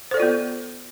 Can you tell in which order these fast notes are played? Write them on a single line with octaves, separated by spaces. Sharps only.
C5 A4 D5 F4 B3